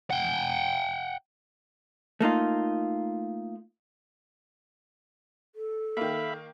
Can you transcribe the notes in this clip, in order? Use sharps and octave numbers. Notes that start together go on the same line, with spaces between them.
F#5 G5
A3 A#3 D#4 F4
A4
D#3 A#3 E5 F5 B5